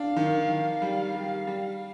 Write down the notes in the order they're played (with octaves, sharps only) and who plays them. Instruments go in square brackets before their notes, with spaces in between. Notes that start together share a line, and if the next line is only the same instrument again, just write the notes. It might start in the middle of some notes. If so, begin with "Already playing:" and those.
Already playing: [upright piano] D4 [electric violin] F5
[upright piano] D#3
D#3
G3
G3
G3